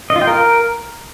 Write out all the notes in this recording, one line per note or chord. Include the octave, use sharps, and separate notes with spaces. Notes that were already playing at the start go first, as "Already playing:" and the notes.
D#5
F4
G5
A#4